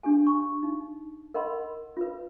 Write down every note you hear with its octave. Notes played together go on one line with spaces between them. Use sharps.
D4 G4 G#4 G#5
C#6
D#4
A#4 D#5 F#5 B5 C6
F4 B4